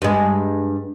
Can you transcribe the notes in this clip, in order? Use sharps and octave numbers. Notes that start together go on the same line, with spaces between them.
G2 G#3